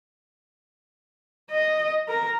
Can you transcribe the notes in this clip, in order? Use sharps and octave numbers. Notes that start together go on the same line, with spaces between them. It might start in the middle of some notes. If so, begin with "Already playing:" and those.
D#5
A#4